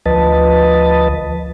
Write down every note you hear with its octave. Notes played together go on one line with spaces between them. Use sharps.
D2 F3 B4 D#5 A5